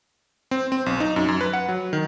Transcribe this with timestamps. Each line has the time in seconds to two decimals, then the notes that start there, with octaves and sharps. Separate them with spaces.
0.51 C4
0.72 C4
0.86 B1
1.00 D#4
1.16 F#2
1.28 F#2
1.41 B4
1.53 F#5
1.69 F#3
1.93 D#3